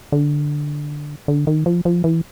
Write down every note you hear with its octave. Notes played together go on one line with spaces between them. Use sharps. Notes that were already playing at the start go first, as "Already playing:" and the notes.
D3
D3
D#3
F3
F3
E3